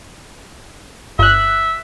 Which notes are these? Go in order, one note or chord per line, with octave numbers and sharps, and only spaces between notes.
G1 E5 F#6